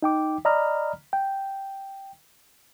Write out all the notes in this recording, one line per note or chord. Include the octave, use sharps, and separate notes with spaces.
D#4 G5 D6
D5 D#5 A#5 B5 F6
G5